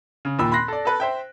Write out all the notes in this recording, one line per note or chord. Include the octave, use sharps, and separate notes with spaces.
C#3
D#2 A#2 B5 E6
B5 C6 F#6 A#6 C7
A4 D5
A4 B4 F#6
C5 E5 G5